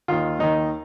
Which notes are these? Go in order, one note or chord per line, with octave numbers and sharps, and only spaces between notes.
D#2 D#3 F4
D#2 D#3 D#4